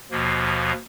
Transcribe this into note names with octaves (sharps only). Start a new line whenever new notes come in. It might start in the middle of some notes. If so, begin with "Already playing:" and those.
D#2 B2 F3 A#3